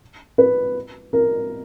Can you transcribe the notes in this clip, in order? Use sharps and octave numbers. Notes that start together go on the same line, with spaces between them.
B4
A#4